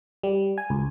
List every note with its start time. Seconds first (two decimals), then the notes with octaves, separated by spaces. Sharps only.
0.23 G3
0.58 G#5
0.70 C#2